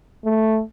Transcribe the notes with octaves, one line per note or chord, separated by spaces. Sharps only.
A3